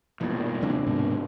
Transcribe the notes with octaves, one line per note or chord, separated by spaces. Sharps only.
E1 E2 G2 A#2 D#3
D1 C3 D4
G#2 B2 D#3